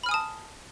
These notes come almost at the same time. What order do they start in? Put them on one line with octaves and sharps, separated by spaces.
B5 F6 G#5 D#6 A5